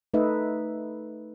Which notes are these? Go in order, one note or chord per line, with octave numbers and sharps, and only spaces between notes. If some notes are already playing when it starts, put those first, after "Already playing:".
A3 D#4 B4 D#5 E5